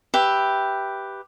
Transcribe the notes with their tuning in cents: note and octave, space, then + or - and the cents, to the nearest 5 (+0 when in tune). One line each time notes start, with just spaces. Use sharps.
G4 +0 B4 +0 E5 +0